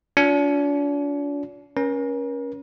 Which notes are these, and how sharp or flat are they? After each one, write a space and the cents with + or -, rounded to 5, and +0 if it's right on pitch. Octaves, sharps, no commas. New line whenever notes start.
D4 -40 F4 +30
C#4 +0 A#4 +40